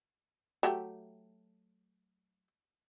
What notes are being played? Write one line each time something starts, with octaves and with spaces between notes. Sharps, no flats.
F#3 A3 G4